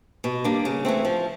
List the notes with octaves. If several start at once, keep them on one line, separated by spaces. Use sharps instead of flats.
B2
G3 A#3 D4
C#3
E3 A3 C4
F3